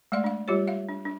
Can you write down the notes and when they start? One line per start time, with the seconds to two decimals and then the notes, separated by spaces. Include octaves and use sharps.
0.12 G#3 A3 D5 F5 C6
0.24 D4 F5
0.48 G3 F4 G4 C#5
0.67 E5 F5
0.89 D4
1.05 D4